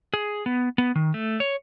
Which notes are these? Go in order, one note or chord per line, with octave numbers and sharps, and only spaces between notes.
G#4
B3
B3
D#3
A3
C#5